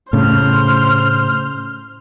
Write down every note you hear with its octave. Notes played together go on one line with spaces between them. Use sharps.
A2 C#3 C5 F6